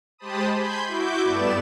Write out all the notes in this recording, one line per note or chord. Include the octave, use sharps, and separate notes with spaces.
G#3 G4 C5 A5 B5 D#6
G#5 B5 C6 G6
E4 F#4 D6 G6
G2 A3 B3 D5 E7